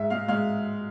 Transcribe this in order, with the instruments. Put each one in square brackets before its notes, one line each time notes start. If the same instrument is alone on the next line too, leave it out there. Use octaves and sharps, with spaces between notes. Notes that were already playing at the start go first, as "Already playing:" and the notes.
Already playing: [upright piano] G#2 E5
G#3 F5
G#3 F5